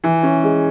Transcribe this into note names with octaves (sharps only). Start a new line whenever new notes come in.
E3
C#4
G#3